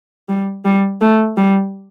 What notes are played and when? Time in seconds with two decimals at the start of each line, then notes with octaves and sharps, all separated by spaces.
0.29 G3
0.65 G3
1.01 A3
1.37 G3